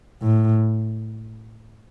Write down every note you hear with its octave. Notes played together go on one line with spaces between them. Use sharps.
A2